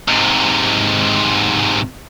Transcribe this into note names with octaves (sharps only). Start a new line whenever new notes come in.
G#2 C3